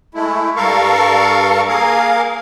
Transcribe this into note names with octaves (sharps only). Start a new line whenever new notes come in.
G#3 A3 E4
G2 A4 A#4 F5 C#6
A#3 G#4 A#4 F5